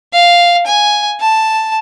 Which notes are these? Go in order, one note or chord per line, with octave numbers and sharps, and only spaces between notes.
F5
G#5
A5